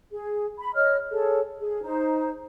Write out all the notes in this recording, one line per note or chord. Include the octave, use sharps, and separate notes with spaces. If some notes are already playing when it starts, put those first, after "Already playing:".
G#4
B5
C#5 D#5 F6
G#4 A4 C#5
G#4
D#4 C5